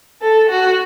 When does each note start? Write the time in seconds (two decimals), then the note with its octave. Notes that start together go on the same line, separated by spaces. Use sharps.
0.22 A4
0.50 F#4